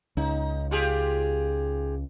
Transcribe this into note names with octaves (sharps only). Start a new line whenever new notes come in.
C#2 D#4
F4 G4 G#4